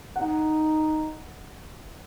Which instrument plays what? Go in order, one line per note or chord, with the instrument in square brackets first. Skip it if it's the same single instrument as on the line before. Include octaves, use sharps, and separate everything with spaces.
[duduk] D#4 [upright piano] F#5